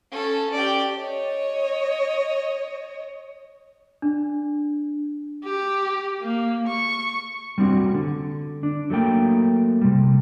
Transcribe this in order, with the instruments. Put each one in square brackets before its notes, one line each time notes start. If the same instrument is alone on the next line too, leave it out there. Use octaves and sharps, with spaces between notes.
[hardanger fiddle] C#4 A4
G4 D5
[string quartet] C#5 D#5
[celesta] D4
[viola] G4
A#3
C#6
[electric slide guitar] G3 C4 D4 F#4
D3
D4
F#3 A3 A#3 G5
C3 G3